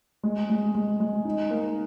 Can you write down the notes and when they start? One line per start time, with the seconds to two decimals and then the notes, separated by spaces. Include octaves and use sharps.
0.23 G#3
0.50 G#3
0.75 G#3
1.00 G#3
1.25 D#4
1.51 A#3